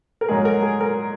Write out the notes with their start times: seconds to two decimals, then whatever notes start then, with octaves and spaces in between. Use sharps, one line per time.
0.21 A#4
0.28 G#2 F#3 G#4
0.45 A#4
0.63 G#4
0.81 A#4